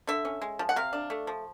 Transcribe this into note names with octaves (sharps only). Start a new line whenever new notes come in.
D3 E5
C#4
G#3
F3
F#5
C3 F5
D4
A3
F3